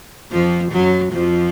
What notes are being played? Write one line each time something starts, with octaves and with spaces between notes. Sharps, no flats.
F2 F3
F#2 F#3
F2 F3